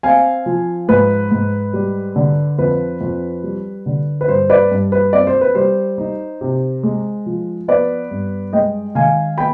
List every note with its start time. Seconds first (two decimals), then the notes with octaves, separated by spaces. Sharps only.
0.03 C4 F5 G#5
0.46 F3
0.88 G#2 B4
1.31 G#2
1.74 G3
2.16 D3
2.59 F2 B4
3.01 F2
3.43 G3
3.86 D3
4.21 B4
4.28 G2 C5
4.50 B4 D5
4.71 G2
4.92 B4
5.13 C4 D5
5.27 C5
5.41 B4
5.55 G3 C5
5.98 D#4
6.41 C3
6.83 G#3
7.26 F3
7.68 B3 B4 D5
8.10 G2
8.53 G#3 D#5 G5
8.95 D#3 F5 G#5
9.38 B3 G5 B5